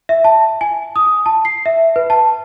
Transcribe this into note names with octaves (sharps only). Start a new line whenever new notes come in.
E5
A5
G#5
D#6
A5
C7
E5
B4
A5